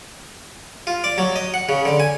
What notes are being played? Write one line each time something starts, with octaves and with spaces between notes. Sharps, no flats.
F4
D5
F#3
D#5
F#5
C#3
D3
G#5